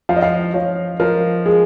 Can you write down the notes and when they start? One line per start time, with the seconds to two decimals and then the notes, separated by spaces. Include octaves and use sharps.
0.09 F3 F5
0.16 D#5
0.22 F5
0.54 F3 C#5
1.00 F3 A#4
1.46 G#3 G#4